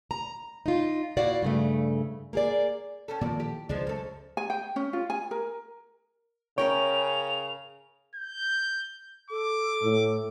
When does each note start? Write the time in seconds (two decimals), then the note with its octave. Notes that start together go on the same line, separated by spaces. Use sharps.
0.11 A#5
0.66 D#4 F4
1.17 A#2 E4 F#4 D5 F5 F#5
1.42 G2 C#3 A3
2.33 A#3 G#4 D5
3.08 C#4 G4 A4
3.21 E2 A#2 D#3 F3 D5
3.40 G4
3.69 C#2 F3 G#3 D4
3.87 F#2 A4
4.37 G#5
4.50 G5
4.76 C#4
4.93 F4
5.10 G#5
5.31 A#4
6.58 C#3 C#4 A#4 C#5 G5 F7
8.15 G6
9.31 A4 D6
9.82 A2